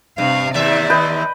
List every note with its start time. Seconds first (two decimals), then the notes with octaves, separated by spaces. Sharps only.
0.18 G2 C3 F5
0.54 D#2 C3 D5 E5
0.90 B4 D#5 G5